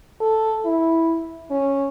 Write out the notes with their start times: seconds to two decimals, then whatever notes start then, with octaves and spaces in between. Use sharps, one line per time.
0.21 A4
0.65 E4
1.51 C#4